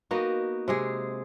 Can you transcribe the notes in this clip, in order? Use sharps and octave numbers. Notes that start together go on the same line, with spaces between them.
A#3 B3 D#4 F#4
C3 G#3 G#4